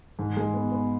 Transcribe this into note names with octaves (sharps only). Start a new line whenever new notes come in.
G#2
G#3
B3
B3